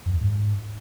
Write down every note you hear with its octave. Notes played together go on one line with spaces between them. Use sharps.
F2
E2
G#2